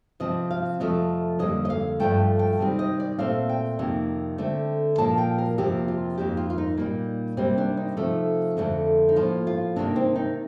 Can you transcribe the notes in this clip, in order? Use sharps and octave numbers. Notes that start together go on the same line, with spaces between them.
C3 F3 C4 D#5
F5
F2 C3 F3 A3 D#5
F2 D3 G3 A#3 D#5
D#5
F5
G2 F3 A3 G5
G5
C3 D#3 G3 C4
D#5
D5
A#2 A3 C4 F5
G5
F2 C3 D#3 A#3
D3 A3 C4
A#2 F3 A#3 A5
G5
A#4
F2 C3 F3 A#3 G4
F4
F2 D#3 A#3 G4
F4
F4
D#4
A#2 G3 A#3
C3 G3 A#3 C4
D4
D#4
C3 F3 A3 C4
F2 D3 A3 C4
D#4
A2 F3 A#3 F4
F4
C3 D#3 G3 A#3 D4
C4
D#4